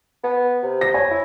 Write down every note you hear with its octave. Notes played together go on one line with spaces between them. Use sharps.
B3
C3
A#6
C#5 G#5
E4